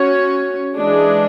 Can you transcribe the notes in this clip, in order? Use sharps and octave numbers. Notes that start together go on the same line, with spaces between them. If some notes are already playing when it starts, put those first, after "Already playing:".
Already playing: C#4 F#4 C#5
E3 G#3 D4 G#4